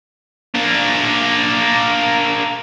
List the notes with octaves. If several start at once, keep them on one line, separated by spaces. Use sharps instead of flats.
A#3 D4